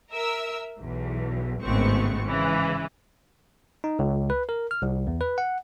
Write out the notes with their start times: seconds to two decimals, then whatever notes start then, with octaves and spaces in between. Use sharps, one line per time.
0.12 A#4 E5 E6
0.78 B1 E2
1.62 G#1 C#2 A2 B3 C4 C#6
2.23 G#2 C#3 E3
3.84 D#4
3.99 C#2
4.30 B4
4.49 A#4
4.71 F6
4.82 C2
5.07 E2
5.21 B4
5.38 F#5